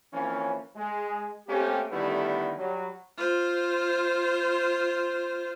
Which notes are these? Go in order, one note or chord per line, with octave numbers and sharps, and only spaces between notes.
E3 F3 A#3 C4 C#4
G#3
A3 A#3 C4 C#4 G4
D3 D#3 G3 A3 B3 E4
F#3 G3
F4 C5